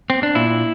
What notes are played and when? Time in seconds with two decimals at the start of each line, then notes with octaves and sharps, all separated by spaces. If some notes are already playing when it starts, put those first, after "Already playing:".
0.10 C4
0.23 D4
0.35 A#2 E4